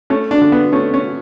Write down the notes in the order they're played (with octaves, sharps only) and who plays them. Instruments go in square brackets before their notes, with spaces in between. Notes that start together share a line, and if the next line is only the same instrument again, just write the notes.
[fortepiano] A3 C#4
D4
D3
B3
A3 C#4
C#4